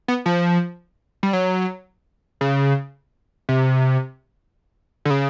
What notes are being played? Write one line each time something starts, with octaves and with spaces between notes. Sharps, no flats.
B3
F3
G3
F#3
C#3
C3
D3
C#3